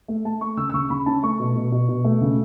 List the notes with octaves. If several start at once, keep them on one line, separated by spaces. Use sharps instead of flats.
A3
A3 A5
A3 C#6
C#3 E6
E6
C#3 C#6
C#3 B5
C#4 A5
A3 C#6
B2
B2
B2
B2
A3
C#3